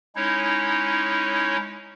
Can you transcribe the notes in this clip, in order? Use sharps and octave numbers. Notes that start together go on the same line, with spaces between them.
G#3 C#4 D#4 E4 C#5